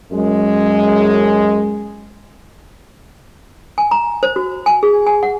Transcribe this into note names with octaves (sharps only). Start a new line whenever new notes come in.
F#2 G#3
G#5
A#5
C5
F#4
G#5
G#4
G#5
F#5